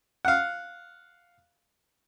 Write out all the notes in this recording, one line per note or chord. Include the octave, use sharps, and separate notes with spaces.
F5 F#5